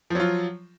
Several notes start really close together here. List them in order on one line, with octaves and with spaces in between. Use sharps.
F3 F#3 F4